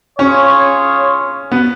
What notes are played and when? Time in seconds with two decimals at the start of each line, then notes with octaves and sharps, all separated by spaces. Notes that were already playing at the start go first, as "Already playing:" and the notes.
0.18 C#4 F4 G#4 C#5
1.52 B3